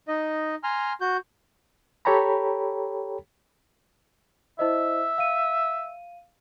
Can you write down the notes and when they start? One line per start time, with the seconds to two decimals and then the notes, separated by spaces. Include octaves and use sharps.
0.08 D#4 D#5
0.64 G#5 A#5 C6 F6
1.01 F#4 G6
2.05 G4 A4 C#5 G5 A#5 B5
4.59 E4 C5 D#5 E5
5.18 F5 D#7